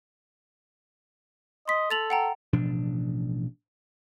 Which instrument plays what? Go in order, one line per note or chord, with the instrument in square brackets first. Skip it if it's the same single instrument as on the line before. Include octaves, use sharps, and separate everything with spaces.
[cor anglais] D#5 [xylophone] C6 B6
[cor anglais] A4 [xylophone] A6 F7 F#7
[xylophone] F#5 G5 A#5
[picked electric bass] A1 B2 F3 D4